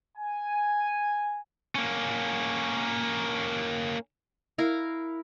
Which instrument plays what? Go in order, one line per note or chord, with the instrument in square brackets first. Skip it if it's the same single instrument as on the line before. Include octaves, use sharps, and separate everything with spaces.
[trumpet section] G#5
[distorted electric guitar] A#3 C#4
[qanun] E4 A#4 F5 A#5